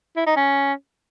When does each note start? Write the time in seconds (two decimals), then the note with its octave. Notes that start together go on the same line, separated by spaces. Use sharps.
0.16 E4
0.26 D#4
0.36 C#4